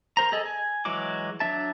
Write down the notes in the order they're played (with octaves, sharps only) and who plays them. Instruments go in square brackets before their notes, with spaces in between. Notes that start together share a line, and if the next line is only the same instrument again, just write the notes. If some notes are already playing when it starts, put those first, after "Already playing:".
[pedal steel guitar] A#4 C5 A#5
G#4 A4 D#5
G#5
E3 F#3 G#3 F#4 D6
F#3 D4 E5 A5